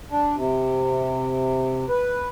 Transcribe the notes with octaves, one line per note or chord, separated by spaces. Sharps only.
D4
C3
B4